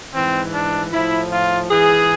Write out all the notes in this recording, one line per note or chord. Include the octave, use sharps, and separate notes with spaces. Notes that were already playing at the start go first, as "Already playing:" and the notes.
G#2 E3 C4
D4
A2 F3 E4
F4
G#2 E3 G#4